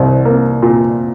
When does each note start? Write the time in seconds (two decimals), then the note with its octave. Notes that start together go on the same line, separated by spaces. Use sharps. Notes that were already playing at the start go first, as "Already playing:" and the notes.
Already playing: C2
0.25 A#3
0.62 A#2